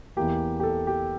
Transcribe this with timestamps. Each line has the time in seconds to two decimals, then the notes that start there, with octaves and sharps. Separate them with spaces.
0.17 E2 E3 A#3 G4
0.60 G4
0.63 A4
0.87 G4